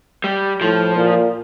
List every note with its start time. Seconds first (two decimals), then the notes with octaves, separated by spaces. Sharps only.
0.24 G3
0.61 A2 F3
0.95 A#2